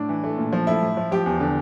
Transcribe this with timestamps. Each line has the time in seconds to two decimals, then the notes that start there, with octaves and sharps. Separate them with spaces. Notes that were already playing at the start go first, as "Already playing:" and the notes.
Already playing: A2 D4
0.09 E3
0.24 A3
0.38 A#2
0.53 F3
0.67 A3 E4
0.83 A2
0.97 F3
1.11 F3 G4
1.26 E2
1.40 D3